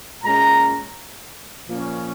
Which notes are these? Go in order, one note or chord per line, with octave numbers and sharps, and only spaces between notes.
A#2 G#3 C#4 A#5
A#2 F3 A#3 C#4